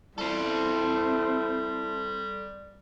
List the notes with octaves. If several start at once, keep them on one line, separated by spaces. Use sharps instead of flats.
G3 C4 E4 A4 C5